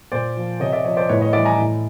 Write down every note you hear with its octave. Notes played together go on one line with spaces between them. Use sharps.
A#2 C5 D5
F3
C3 C#5 D#5
D5 E5
F3 C#5 D#5
C5 D5
A2 B4 C#5
C#5 D#5
E3 G3 D5 E5
G#5 A#5
A2